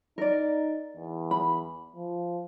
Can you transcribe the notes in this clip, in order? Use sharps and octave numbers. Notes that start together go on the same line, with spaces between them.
D#4 A#4 D5
E2
B5
F3